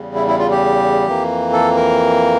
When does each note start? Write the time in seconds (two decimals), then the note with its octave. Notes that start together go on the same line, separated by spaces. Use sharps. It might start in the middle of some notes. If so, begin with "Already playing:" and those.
Already playing: E2 C#3 G3
0.15 E4
0.28 E4
0.39 F4
0.51 G4
1.08 F2 E3 A#3
1.53 A4
1.77 A#4